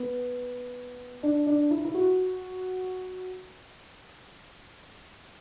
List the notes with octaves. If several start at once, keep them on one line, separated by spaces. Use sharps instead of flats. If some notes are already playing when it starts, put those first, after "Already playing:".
Already playing: B3
D4
D4
E4
E4
F#4